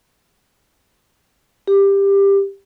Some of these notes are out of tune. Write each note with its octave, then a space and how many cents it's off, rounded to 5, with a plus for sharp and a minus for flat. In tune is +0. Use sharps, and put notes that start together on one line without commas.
G4 +15